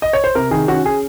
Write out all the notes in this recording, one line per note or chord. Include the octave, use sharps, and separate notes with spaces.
D#5
C#5
C5
C3 A#4
D#3 G#4
C#4 F#4
C#4 G#4